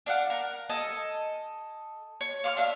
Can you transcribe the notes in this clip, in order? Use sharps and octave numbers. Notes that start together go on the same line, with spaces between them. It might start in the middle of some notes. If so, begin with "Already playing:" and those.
D4 F5 F#5
A#4
A4 D#5 G#5
C#5
F5 C#6 F6
D4 E5 F5